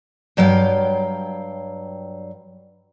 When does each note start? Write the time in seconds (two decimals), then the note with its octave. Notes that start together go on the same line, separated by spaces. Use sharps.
0.37 G2 F#3 F5 G5